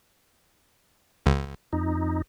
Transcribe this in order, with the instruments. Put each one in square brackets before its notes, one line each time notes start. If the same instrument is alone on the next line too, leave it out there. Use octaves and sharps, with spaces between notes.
[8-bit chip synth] C#2
[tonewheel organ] F2 D#4